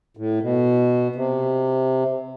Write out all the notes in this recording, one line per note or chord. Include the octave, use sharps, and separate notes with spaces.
A2
B2
C3